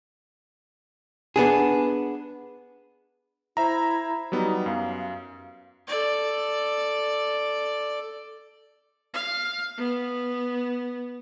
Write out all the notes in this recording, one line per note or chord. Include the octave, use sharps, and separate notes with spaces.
B3 D4 G#4
E4 C5 E5 A#5
F#3 G3 B3 D#4
F#2 F5
A4 D5
F5
B3